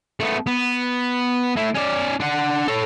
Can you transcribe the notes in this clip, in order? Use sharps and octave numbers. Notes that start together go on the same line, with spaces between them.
A3 B3
B3
A2 E4
C#4 D5
D4 F#5
A4 C#5